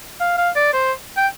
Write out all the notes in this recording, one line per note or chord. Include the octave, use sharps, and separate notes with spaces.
F5
F5
D5
C5
G5